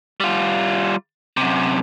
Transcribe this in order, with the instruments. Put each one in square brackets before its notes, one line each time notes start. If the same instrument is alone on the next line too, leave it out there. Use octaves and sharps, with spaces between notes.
[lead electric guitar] G3 F4
F#2 C3